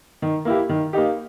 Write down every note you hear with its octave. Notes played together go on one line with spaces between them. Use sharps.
D#3
A#3 E4 G4
D#3
A#3 D#4 G4